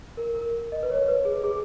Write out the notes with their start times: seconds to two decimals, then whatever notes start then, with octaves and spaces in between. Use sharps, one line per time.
0.17 A#4
0.35 A#4
0.53 A#4
0.72 D#5
0.83 B4
0.90 C#5
1.08 B4
1.25 G#4
1.44 G#4